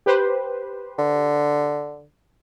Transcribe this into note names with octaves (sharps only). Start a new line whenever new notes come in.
G4 B4 C5
D3